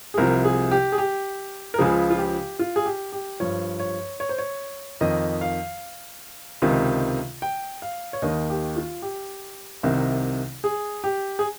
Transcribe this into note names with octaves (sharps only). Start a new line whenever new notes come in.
G#4
C2 C3 F3 A#4
G#4
G4
G#4
G4
A#4
C#2 C#3 F3 G#4
F4
G4
F4
G#4
G4
G4
G2 F3 C#5
C#5
C#5
C5
C#5
F2 D#3 D#5
F5
C#2 C3 D#3
G5
F5
C#5
D#2 D#3 D#5
G4
F4
G4
C2 C3 D#3
G#4
G4
G#4